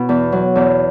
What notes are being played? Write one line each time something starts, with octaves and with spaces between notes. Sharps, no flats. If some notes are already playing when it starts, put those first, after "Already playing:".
Already playing: B2 E4
E2
F#3
E2